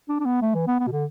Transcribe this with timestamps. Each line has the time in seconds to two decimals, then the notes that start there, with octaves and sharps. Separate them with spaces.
0.09 D4
0.20 D4
0.25 B3
0.42 A3
0.54 E3
0.67 B3
0.79 B3
0.87 B2
0.91 D3